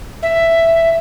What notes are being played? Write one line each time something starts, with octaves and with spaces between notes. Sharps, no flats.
E5